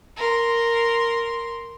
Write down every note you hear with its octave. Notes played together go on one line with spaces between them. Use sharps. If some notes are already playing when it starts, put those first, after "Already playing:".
A#4 C6